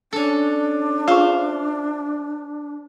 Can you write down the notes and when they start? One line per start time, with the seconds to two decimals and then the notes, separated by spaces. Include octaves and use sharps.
0.13 C#4 D4 A4
1.08 F4 G#4 C5 E5 F5 C#6